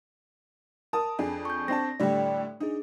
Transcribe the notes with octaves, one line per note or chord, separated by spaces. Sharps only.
A#4 A5 D#6
F2 D4 G#4
C#6 G6
C4 D4 A5 A#6
A2 D3 G3 D5 G5
D4 D#4 G#4